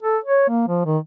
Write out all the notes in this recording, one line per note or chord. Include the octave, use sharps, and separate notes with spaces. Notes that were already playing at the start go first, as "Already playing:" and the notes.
A4
C#5
A#3
F3
D#3